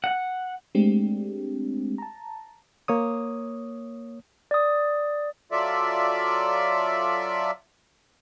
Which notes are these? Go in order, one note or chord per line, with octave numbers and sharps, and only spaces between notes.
F#5
G#3 A3 C4 D4 G4
A5 A#5
A#3 C#5 D#6
D5 D#6
F#3 F4 A4 D5 E5